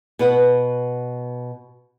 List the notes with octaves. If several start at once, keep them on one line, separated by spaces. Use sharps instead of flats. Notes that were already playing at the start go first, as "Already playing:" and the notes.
B2 B4 F#5